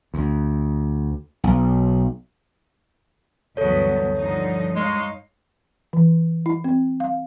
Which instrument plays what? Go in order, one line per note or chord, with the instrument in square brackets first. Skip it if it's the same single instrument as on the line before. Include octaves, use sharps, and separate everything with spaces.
[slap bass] D2
B1
[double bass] D2 G2 [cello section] E3 F#3 B3 [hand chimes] A4 C#5
[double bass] G2 [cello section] D3 F3 D#4
[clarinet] G#3 [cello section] D#4 C#5 F5
[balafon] E3
E4
C4
F5